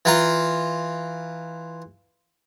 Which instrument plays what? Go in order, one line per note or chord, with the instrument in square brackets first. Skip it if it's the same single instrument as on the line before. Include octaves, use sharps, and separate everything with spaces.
[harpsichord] E3 F4 A#5